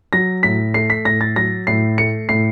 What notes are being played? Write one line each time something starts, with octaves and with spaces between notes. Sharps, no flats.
F#3 A#6
A2 B6
A3 C7
B6
A2 A#6
A6
F#3 A#6
A2 C7
A3 C#7
A2 C7